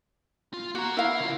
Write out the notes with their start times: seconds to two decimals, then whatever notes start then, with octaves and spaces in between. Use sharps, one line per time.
0.54 F4
0.75 A#3 F#4 A#5
0.97 E4 A#4 F5
1.20 C#3 F4